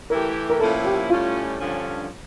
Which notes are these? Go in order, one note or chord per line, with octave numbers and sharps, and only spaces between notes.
E3 A3 E4 G4 A#4
A#4
A2 F3 A#3 C#4 E4 A4
G4
A2 G3 C#4 F4
G2 D3 F3 C#4